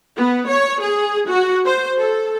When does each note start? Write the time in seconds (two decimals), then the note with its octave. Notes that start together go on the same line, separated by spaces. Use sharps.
0.16 B3
0.48 C#5
0.81 G#4
1.28 F#4
1.65 C5
1.99 A4